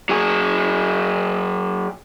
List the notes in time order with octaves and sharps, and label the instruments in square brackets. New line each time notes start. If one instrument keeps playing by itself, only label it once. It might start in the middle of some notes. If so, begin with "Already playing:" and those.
[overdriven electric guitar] F#3 G#4